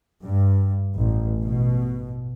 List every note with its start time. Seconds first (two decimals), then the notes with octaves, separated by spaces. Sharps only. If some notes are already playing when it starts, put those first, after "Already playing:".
0.24 G2
0.97 A1
1.41 B2